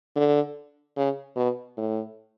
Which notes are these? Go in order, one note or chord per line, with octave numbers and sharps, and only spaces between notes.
D3
C#3
B2
A2